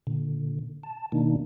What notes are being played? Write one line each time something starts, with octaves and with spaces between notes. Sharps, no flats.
A#2 D3
A5
B2 D#3 A#3 D4 D#4